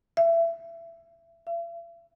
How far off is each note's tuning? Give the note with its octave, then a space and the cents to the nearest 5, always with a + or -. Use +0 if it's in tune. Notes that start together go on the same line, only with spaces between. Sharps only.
E5 +25
E5 +45